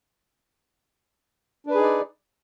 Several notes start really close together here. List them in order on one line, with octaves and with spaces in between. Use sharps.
D4 B4 G#4 D#4 D5